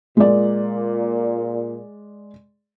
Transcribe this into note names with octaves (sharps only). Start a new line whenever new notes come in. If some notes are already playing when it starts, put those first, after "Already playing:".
A#2 G#3 D5